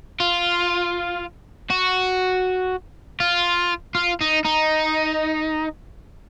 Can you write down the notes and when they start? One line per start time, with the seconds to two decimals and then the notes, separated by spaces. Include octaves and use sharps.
0.20 F4
1.70 F#4
3.20 F4
3.95 F4
4.21 D#4
4.45 D#4